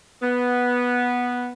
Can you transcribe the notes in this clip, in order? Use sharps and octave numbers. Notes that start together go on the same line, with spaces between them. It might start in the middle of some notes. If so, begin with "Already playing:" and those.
B3